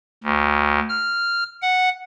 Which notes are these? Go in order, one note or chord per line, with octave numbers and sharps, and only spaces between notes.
D2
F6
F#5